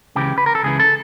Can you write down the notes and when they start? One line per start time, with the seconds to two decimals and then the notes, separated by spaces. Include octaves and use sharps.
0.15 C#2 C#3 E3 G4
0.38 B4
0.46 A#4
0.55 A4
0.63 C#2 C#3 E3 G#4
0.79 A4